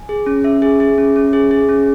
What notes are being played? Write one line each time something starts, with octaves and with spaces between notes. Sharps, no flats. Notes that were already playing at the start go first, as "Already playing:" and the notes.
Already playing: G#5
G#4
C#4
C#4 E5
G#4
G#4
C#4
C#4
G#4
G#4
C#4